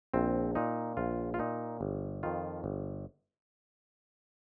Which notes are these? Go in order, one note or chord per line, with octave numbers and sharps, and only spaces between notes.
A#1 C4
A#2 D#4
A#1 F4
F4
A#2 D#4
G1
F2 D#3 F4
G1